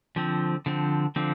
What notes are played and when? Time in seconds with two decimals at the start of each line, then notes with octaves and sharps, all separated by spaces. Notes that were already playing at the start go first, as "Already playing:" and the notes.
0.16 D3 F3 C4
0.66 D3 F3 C4
1.16 D3 F3 C4